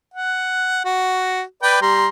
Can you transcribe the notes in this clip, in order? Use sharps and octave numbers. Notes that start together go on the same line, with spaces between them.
F#5
F#4
B4 D5 G5
G3 A#5 C6